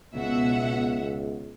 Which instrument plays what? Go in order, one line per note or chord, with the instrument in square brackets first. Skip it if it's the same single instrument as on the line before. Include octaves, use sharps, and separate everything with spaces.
[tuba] C#2 [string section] B2 E5 F#5